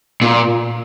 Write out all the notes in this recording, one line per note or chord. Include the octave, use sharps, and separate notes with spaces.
A#2